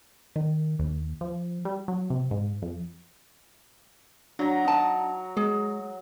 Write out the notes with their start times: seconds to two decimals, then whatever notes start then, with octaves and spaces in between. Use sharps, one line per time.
0.36 D#3
0.79 D#2
1.21 F3
1.65 G3
1.88 F#3
2.10 C3
2.31 G#2
2.62 F2
4.39 F#3 D4 A#5
4.65 D#4 A5
5.37 G#3 G#4